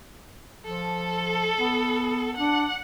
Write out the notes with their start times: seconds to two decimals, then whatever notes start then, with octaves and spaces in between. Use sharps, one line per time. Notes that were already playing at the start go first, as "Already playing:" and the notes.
0.65 F3 A4
1.59 B3
2.37 D4 F#5